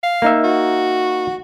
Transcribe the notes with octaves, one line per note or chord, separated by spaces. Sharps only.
F5
A#3 D#4 E5
F#4